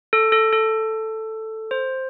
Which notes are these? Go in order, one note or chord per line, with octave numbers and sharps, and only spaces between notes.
A4
A4
A4
C5